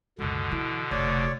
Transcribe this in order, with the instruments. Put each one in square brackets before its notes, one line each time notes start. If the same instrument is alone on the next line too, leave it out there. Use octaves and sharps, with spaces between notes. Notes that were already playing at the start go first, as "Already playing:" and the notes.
[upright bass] C#2 F#2 [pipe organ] B2 D3
[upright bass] E3
[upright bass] F1 [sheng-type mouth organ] C#5 D5